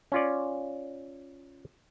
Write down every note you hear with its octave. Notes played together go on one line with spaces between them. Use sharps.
C#4 F4 D5